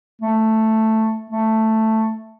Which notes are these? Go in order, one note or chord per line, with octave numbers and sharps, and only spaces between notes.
A3
A3